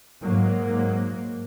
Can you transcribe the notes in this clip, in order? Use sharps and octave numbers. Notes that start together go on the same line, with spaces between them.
G#2 F#3 A#3